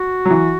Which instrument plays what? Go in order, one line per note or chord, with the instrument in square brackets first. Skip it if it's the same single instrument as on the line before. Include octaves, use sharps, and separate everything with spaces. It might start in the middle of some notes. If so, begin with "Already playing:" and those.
Already playing: [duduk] F#4
[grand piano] F#3
E3